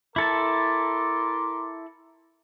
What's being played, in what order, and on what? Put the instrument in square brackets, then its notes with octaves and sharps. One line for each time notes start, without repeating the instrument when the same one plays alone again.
[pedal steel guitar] E4 A4 A5 [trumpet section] A#4 C6 D6